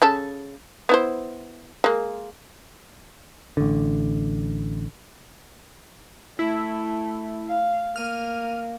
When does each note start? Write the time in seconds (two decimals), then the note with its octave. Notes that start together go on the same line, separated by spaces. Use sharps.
0.02 C#3 A4 A5
0.89 B3 E4 C5
1.84 G#3 A#3
3.57 A1 D3
6.39 A3 E4
7.48 F5
7.96 A#3 F6 D#7